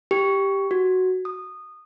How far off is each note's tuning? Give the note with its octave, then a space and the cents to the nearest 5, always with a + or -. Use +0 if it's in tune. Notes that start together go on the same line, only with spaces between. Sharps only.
G4 +0
F#4 +5
D#6 -15